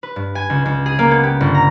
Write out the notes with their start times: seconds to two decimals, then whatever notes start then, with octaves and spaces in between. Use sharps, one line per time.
0.03 B4
0.16 G2
0.35 G#5
0.50 C#2
0.66 C#2
0.86 G#4
0.99 A#3
1.11 B3
1.23 G4
1.41 G1
1.55 A#5